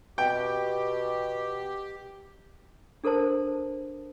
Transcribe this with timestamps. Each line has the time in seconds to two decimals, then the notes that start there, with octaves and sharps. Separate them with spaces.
0.18 B2 G4 G5
3.04 D4 A4 A#4 C5 A5